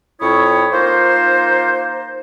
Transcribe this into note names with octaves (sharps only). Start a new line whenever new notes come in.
F2 C4 E4 C#5 C#6 D#6
A#3 D#4 F4 C5